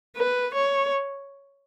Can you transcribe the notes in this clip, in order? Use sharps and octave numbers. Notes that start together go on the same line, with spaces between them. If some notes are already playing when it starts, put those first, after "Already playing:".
B4
C#5